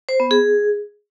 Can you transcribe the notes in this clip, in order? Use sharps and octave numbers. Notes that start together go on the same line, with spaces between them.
C5
B3
G#4